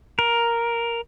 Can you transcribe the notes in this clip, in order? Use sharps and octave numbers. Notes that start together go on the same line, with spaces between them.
A#4